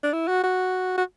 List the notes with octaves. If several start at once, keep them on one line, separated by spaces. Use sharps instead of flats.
D4
E4
F#4
F#4
F#4